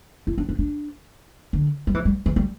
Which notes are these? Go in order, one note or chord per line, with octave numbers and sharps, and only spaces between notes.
E4
D4
D4
D4
D3
G3
E3
G3
E3
G3